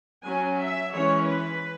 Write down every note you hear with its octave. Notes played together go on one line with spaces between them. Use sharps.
F#3 C#4 G#5
E5
E3 G#3 C#4 C#5
B4